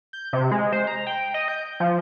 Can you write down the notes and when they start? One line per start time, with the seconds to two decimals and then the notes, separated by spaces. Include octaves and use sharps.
0.13 G6
0.33 C3
0.51 G#3
0.73 C5
0.87 A#5
1.07 G5
1.34 D#5
1.48 G6
1.80 F3